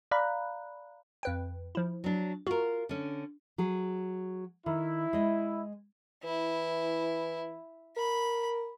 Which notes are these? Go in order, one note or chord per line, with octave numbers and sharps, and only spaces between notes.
D5 F5 A#5 B5 F#6
F2 B4 G5
F3 E4
F#3 D4
F4 F#4 A#4
D3 C#4
F#3 G#4
D#3 E4
G#3 D#5
E3 E4
A#4 B5